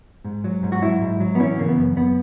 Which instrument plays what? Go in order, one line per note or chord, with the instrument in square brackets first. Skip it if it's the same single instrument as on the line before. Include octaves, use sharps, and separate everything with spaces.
[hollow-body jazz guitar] G#2
F#3
G#2
F#4
F#3 E4
G#2
F#3
B3
E3 C#4
C#3 A#3
B3
F#2
F#2 B3